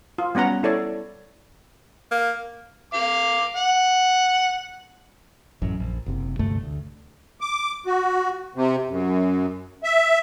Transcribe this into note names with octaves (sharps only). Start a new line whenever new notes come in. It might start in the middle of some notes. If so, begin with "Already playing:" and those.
F4
G3 B3 C#4 F#5 A#5
E4 A4 C#5 D5
A#3
F5 D6
F#5
A1 F#2
A#1
F#1 C3
D2 G2 C3 A3
D2
D6
F#4
C3
F#2
E5